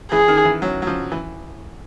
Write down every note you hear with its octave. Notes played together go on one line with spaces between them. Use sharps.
E3 G#4
D#3
E3
F#3
F#3
F3
E3